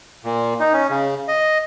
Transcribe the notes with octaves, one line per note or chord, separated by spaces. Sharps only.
A#2
D#4
C#4
C#3
D#5